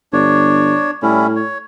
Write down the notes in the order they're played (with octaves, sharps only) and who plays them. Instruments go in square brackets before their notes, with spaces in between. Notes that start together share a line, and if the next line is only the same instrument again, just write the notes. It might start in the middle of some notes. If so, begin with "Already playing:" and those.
[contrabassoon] G1 [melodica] D4 C#5
[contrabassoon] A2 [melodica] G3 C#4 E4
[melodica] C#5